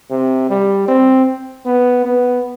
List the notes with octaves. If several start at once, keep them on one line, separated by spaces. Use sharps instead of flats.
C3
G3
C4
B3
B3